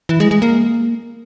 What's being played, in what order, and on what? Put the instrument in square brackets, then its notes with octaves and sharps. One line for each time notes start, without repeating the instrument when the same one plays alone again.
[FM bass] E3
G#3
G#3
A#3